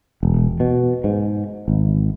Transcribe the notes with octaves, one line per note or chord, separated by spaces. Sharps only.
E1
B2
G#2
G#1